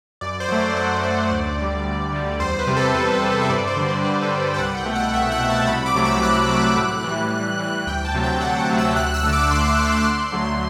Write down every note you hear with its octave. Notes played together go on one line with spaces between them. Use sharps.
F#2 D5
C5
F#3 A3
D5
F#2 F#5
F#3 A3 D5
D2
D3 G3
D2
D3 G3
E2 C5
B4
C3 G3
A4
E2 B4
B4
C3 G3
C5
E5
G2 D5
C5
D3 G3
B4
G2 B4
A4
D3 G3
B4
G5
C2 F#5
G5
B2 A3
F#5
C2 E5
F#5
B2 A3
A5
C2 B5
D6
C3 F#3 A3
E6
C2 F#6
C3 F#3 A3
A2
E3 G3
A2
E3 G3
D2 G5
A5
C3 F#3 A3
G5
D2 F#5
F#5
C3 F#3 A3
E6
D2 F#6
E6
D3 A3
D6
D2 C6
D3 A3
D2
D3 F#3 A3